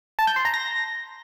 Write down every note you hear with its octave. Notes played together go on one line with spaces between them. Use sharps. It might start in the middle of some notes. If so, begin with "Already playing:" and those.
A5
G6
C6
A#5
A#6